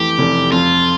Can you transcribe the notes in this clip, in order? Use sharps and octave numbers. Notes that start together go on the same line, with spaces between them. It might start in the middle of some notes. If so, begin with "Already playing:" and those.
Already playing: F2 E3 A3 G4
F1
F2 F4